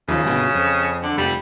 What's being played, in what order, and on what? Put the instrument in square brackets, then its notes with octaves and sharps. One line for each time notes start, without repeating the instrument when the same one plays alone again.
[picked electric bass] D#2 F3 [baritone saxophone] C#3
[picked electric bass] G1 B2
F2
[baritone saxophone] D3
[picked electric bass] F1 [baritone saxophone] G3